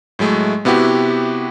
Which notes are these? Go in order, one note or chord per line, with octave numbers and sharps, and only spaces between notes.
A2 F#3 G#3 A3
C3 B3 E4 F#4 G4